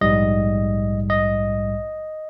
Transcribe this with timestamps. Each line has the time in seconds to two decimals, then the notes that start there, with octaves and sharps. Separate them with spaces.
0.01 A#1 G#2 G3 D#5
1.10 D#5